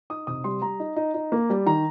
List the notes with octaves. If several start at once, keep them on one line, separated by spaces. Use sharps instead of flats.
D#4 D#6
C3 D#6
G3 C6
G3 A#5
D#4
D#4
D#4
A#3
G3
D#3 A#5